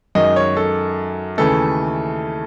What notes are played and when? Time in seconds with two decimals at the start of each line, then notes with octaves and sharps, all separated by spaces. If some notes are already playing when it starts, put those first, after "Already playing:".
0.15 F#2 D#3 G#3 D#5
0.36 C#5
0.57 A4
1.38 D#2 C#3 E3 A3 A4